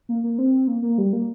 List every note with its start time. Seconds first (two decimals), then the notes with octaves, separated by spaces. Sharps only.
0.09 A#3
0.24 A#3
0.39 C4
0.68 A#3
0.82 A#3
0.98 G3
1.13 A#3